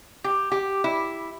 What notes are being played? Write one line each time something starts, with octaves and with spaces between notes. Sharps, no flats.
G4
G4
E4